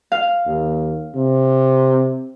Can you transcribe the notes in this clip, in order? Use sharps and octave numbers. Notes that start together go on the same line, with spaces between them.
F5
D#2
C3